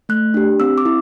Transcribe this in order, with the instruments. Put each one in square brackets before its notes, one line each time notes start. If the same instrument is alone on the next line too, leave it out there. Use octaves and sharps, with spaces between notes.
[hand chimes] A3 F#6
D4 G4
C4 E6
D6
E4